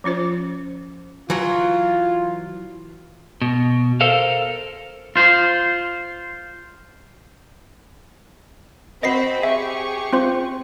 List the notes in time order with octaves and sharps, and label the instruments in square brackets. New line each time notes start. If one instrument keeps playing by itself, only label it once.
[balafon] F3 C#4 F4 C5
[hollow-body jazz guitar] E3 F#3 [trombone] F4
[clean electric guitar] B2
A4 A#4 C5 F5
F4 C5
[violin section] C4 F#4 B5 [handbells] D#5 A#6 C7
[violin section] G4 G#4 C#6 [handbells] E5
[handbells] C4 F4 C5